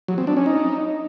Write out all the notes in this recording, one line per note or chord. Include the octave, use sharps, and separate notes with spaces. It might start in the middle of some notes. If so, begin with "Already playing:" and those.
F#3
C4
D4
C#4
D#4